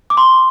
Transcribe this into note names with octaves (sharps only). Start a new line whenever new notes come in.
D6
C6